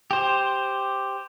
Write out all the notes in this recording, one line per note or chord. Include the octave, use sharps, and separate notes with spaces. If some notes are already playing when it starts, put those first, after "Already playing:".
G4 C5